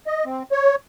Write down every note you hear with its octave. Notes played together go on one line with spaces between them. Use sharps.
D#5
C4
C#5